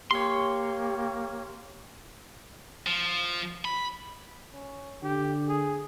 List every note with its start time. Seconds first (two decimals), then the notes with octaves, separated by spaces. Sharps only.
0.11 A#3 G4 C#5 C6
2.87 F3
3.65 B5
4.53 C#4
5.03 D3 G4
5.48 G#4